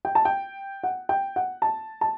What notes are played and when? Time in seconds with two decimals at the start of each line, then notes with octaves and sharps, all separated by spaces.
0.05 G5
0.15 A5
0.25 G5
0.83 F#5
1.09 G5
1.36 F#5
1.62 A5
2.01 A5